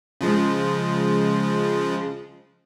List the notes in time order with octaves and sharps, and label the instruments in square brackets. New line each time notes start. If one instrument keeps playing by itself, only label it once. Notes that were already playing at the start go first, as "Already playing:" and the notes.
[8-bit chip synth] C#3 F3 G#3